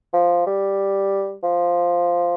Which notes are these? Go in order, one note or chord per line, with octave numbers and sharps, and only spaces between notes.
F3
G3
F3